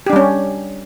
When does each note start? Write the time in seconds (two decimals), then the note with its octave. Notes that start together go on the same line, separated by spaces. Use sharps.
0.06 G4
0.10 D4
0.13 G3
0.16 C#4